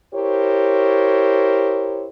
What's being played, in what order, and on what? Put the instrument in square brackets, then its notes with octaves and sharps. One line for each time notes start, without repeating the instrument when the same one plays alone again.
[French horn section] E4 G4 A#4 C5 C#5